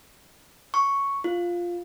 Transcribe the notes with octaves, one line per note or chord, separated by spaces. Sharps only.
C#6
F4